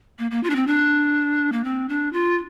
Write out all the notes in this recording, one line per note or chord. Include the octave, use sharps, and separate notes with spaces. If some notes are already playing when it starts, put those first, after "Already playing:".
A#3
A#3
F4
D4
C4
D4
A#3
C4
D4
F4